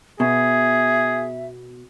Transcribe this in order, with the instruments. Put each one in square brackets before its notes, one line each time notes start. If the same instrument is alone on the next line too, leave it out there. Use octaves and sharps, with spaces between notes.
[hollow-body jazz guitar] B2 [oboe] G#4 [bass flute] E5